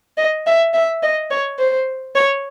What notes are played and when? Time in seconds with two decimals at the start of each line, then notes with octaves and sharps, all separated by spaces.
0.18 D#5
0.47 E5
0.74 E5
1.03 D#5
1.31 C#5
1.59 C5
2.15 C#5